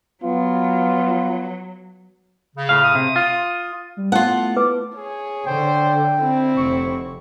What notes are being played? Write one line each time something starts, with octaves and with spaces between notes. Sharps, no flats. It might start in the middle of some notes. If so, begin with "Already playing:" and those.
F#3 B3 F4
C#3
A2 F5
D#6
C3
F4
G3
A3 B3 E4 F4 F#5 A5
B4 D6
G#4 C#5
D3 C5 G5
C4 E4
F1 C#6